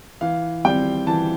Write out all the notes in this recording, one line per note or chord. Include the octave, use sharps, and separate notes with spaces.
E3 F5
G3 C4 G5
E3 A5